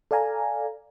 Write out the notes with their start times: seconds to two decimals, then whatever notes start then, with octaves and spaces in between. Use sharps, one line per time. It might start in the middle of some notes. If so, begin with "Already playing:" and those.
0.11 A4 D5 F5 G#5 A#5